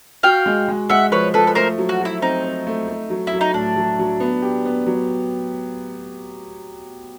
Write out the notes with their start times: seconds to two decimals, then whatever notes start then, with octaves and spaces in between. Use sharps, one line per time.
0.23 F#4 F5 G5
0.46 G#3
0.68 G#3
0.90 G#3 E5 F#5
1.11 F3 B4 C#5
1.34 F3 A4 B4
1.47 B4
1.55 A3 A#4 C5
1.78 F#3
1.89 F#4
2.01 F#3 E4
2.22 C4 D#4
2.44 C4
2.67 A3
2.88 A3
3.10 F#3
3.27 E4
3.33 F#3
3.41 D#4
3.54 A2 D4
3.76 F#3
3.99 F#3
4.20 B3
4.42 G4
4.65 B3
4.87 F#3